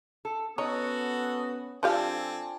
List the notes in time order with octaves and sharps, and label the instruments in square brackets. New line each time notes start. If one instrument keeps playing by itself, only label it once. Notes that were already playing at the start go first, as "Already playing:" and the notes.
[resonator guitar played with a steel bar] A4
[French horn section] B3 C#4 [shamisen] D#4 [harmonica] F#4 A4 D#6 [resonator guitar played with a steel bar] C#5
[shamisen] F3 G4 F5 [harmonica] C4 A4 G#5 [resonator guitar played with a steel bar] D4 F4